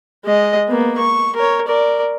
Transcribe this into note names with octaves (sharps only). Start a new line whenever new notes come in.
G#3 D#5
A#3 B3
C#6
A#4 C#5
A#4 D5